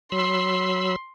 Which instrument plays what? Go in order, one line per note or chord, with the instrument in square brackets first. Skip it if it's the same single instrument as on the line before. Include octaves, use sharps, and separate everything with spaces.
[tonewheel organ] F#3 B5 E6 [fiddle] C6